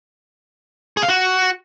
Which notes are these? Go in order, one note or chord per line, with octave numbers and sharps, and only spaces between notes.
G#4
F5
F#4